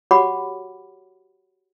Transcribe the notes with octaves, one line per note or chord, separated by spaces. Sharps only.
F#4 G4 C#5 F#5 B5 D6